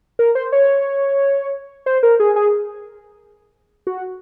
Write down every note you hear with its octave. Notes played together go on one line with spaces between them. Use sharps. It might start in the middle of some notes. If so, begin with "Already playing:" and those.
A#4
C5
C#5
C5
A#4
G#4
G#4
F#4